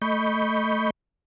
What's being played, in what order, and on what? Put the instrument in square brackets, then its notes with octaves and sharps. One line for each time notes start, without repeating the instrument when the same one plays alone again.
[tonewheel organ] A3 D#5 B5 C#6 G6